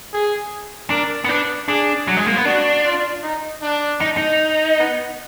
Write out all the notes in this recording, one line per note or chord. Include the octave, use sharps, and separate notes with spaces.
G#4
D4 A#4
B3
D4 B4
D4 G#4
F#3
G#3
A#3
B3
D4 F#4
F4
D#4
D4
D#4
D#4
B3